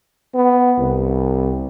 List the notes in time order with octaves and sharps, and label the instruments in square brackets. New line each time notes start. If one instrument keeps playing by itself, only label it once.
[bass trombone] B3
C2